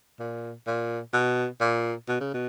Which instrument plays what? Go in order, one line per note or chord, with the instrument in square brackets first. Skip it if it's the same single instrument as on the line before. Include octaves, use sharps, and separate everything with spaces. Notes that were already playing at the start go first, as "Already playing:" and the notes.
[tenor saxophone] A#2
A#2
B2
A#2
B2
C#3
B2